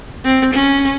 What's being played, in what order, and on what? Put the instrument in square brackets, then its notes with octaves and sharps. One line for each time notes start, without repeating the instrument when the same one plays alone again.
[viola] C4
C#4